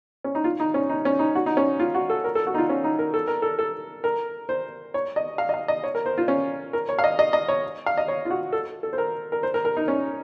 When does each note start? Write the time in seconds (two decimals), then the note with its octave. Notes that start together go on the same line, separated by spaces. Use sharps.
0.24 C#4
0.35 D#4
0.44 F4
0.60 D#4
0.74 C#4
0.90 D#4
1.05 C#4
1.19 D#4
1.35 F#4
1.46 D#4
1.57 C#4
1.80 F4
1.94 F#4
2.10 A4
2.24 A#4
2.35 A4
2.47 F#4
2.54 D#4
2.58 F4
2.69 C#4
2.84 D#4
2.99 A#4
3.14 A4
3.28 A#4
3.42 A4
3.59 A4
4.04 A#4
4.49 C5
4.94 C#5
5.16 D#5
5.38 F5
5.49 D#5
5.54 F5
5.68 D#5
5.84 C#5
5.95 A#4
6.06 C5
6.18 F4
6.28 C#4
6.73 A#4
6.89 C#5
6.99 F5
7.04 D#5
7.19 D#5
7.33 D#5
7.48 C#5
7.86 F5
7.97 D#5
8.08 C#5
8.25 F4
8.30 F#4
8.53 A4
8.83 A4
8.93 C5
8.98 A#4
9.32 A#4
9.43 C5
9.54 A#4
9.65 A#4
9.77 D#4
9.88 C#4